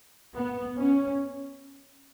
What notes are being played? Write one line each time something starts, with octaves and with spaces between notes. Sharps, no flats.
B3
C#4